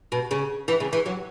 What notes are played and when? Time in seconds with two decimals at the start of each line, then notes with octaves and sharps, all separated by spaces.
0.12 B2
0.31 C#3
0.68 E3
0.80 C#3
0.93 E3
1.06 F#3